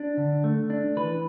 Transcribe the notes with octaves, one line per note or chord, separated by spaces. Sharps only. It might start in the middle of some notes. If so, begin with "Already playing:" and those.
Already playing: D4
D3
A3
D4
E3 B4